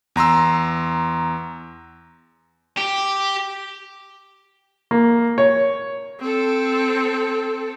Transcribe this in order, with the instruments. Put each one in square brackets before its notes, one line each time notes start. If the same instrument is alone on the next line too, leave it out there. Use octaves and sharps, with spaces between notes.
[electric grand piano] E2 A#5 C6 E6
[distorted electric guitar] G4
[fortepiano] A#3
C#5
[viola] C4 A4